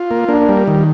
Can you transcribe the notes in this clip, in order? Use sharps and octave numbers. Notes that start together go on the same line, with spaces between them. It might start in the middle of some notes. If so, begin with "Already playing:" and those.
Already playing: F4
A#3
A#3 D4
G3
D#3